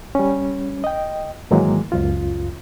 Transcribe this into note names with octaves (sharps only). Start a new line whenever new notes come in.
G3 C#4
D#5 G5
G#2 D#3 E3 F#3 G#3 A#3
C#2 F#2 F4